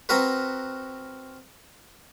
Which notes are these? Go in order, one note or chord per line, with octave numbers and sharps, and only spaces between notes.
C4 F#4 A#4 B4